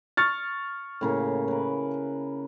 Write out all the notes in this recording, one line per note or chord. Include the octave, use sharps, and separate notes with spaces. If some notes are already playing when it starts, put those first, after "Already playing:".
C#6 F6 A6
A2 C#3 A#3
A#4 B4